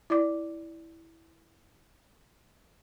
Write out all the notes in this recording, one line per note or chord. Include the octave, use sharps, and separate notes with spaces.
E4 D5 D6